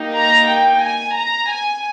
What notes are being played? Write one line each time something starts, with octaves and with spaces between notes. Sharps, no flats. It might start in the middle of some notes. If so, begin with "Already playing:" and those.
Already playing: A#3 D#4 G4
A#5
G5
G#5
A#5
G#5